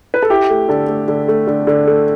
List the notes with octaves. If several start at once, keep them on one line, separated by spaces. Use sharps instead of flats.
B4
A4
E4 G4
A3
D3 A4
A3
D3
A3
D3
D3
A3